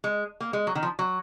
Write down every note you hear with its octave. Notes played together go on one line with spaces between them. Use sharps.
G#3
A#3
G#3
F#3
D#3
F3
F#3